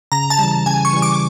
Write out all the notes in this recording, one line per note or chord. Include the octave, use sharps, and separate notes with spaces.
C#3 A#5
A5
E3 G3
C#3 G#5
C#6
E3 G3
D6